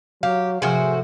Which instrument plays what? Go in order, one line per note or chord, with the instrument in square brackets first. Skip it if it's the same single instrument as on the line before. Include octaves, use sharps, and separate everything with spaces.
[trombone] F#3 [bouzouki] G4 [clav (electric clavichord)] F5
[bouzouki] A2 F#4 C5 [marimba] C3 F3 [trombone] G#4